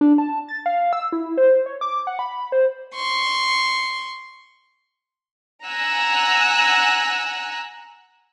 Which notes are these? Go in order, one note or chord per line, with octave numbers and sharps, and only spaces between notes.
D4
A5
A6
F5
E6
E4
C5
C#5
D6
F#5
B5
C5
C6 C#6
F#5 G#5 A#5 E6 F#6